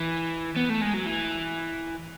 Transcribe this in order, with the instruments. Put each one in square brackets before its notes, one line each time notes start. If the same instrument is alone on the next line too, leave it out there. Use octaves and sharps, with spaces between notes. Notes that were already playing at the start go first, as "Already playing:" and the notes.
Already playing: [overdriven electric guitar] E3
B3
A3
G#3
F#3
E3